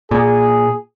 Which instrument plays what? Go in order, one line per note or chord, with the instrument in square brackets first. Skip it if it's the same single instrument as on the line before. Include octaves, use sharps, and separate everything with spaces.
[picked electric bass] A#2 [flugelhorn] G#4